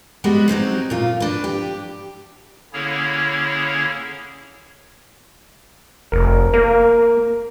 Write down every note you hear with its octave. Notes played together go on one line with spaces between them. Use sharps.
G3 G#3 B3 F#4
F#3 C4 C#4 D#4
A#2 F4
D4 B4
G4
D3 A#3 C#4 E4 G#4 C#5
F1 A#4
A#3 A#4